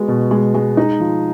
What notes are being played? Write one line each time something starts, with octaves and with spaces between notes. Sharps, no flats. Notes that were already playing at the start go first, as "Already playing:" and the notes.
Already playing: G#3 B3 F#4
B2
G#3
G#3
D#4
F3